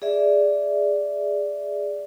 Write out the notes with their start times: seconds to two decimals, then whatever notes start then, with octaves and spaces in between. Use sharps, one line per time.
0.02 G#4 D5 E5